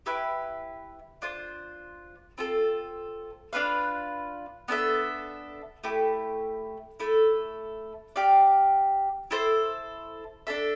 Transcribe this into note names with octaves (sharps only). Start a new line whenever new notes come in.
E4 G4 B4 E5
D4 F4 C5
C4 F4 A4
D4 F4 B4 F5
B3 D4 A4 E5
A3 E4 G4
A3 E4 A4
G4 D5 F5
E4 A4 C5
D4 A4 E5